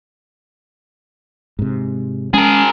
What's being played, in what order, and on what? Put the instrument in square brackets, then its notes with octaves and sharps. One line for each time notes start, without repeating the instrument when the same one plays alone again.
[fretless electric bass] G#2 C3
[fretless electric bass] G#3 C#4 [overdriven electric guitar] G#4 A#4